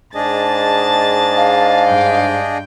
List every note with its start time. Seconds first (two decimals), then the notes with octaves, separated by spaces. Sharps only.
0.15 G#2 D4 G#4 D#5 A5 A6
1.37 F5
1.86 G2 G5